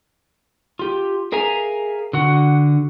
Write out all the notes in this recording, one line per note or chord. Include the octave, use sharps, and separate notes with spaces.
F4 G4
G#4 A#4 E5 F5 G#5 A#5
D3 F#4 F#5